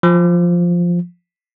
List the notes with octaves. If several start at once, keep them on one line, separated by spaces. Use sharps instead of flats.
F3